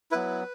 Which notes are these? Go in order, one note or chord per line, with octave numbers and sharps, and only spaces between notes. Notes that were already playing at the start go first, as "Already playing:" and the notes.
F#3 B3 E4 B4